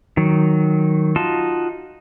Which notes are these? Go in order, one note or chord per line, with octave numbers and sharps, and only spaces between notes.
D#3 F#3
D#4 F4 F#4 A5 C6